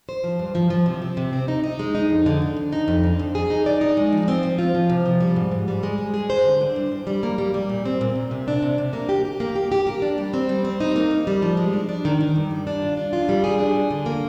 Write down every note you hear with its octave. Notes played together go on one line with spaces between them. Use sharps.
C5
F3
G2
F3
F3
C3
C4
C3
C4
D#4
D#4
G#3
D#4
F2
D3
D3
F2
D#4
F2
D3
F2
G#4
D#4
D5
D#4
G#3
F3
C4
F3
F4
F3
C3
F3
G3
G#2
G#2
G3
G#3
G#3
G#4
C5
D3
D4
G2
G2
G3
A#3
G3
G3
A#2
C4
A#2
A#2
C3
D4
C3
C3
A#3
G4
G4
A#3
G4
G4
A#3
D4
G3
C4
G3
C4
D#4
A#3
A#3
G3
F3
G#3
D4
D4
D#3
D#3
G2
G3
D4
F4
D4
F4
G3
G#4
D4
G#4
D3
A#3